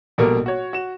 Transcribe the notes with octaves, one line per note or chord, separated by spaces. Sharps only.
A#1 B2 G3 A#3 A4 A#4
F#4 C#5
F#4 E7